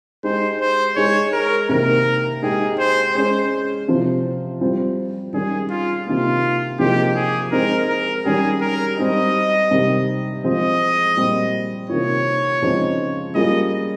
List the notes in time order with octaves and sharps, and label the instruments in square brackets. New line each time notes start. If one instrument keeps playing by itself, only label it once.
[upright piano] G#3 D#4 G4 [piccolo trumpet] C5
[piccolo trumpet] C5
[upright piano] G#3 D#4 G#4 [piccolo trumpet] C#5
[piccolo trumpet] A#4
[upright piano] C3 D#3 A#3 [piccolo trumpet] A#4
[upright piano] G#3 D#4 G4 [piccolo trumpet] G#4
[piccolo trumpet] C5
[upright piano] G#3 C#4 G#4 [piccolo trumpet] C5
[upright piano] C3 F3 C4
G3 C4 F4
[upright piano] D#3 G3 C#4 [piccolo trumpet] G#4
[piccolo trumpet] F4
[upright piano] C3 D#3 A#3 [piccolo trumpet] F4
[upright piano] C3 F3 A#3 D#4 G#4 [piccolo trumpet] G4
[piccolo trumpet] G#4
[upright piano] G#3 C4 D#4 [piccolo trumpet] A#4
[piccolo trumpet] A#4
[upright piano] D#3 G3 C#4 G4 [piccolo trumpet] G#4
[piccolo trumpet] A#4
[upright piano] G3 C4 D#4 [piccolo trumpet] D#5
[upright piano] C3 D#3 G3 C4
[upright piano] F3 G#3 C4 F4 G#4 [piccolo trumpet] D#5
[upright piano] A#2 G3 C4 G4
[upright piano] C3 D#3 A#3 F4 [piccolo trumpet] C#5
[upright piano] C#3 F3 G#3 C4 D#4
[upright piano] G3 A#3 C#4 F4 G#4 [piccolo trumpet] D#5